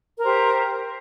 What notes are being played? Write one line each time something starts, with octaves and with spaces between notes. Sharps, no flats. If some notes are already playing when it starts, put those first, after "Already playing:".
G4 A#4 C5